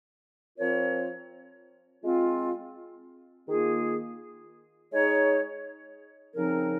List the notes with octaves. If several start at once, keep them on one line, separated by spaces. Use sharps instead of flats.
F3 C4 F4 A#4 C#5
G#3 C4 F4
D#3 A#3 F4 G#4
G#3 D#4 G#4 C#5
C#3 F3 C4 D#4 A#4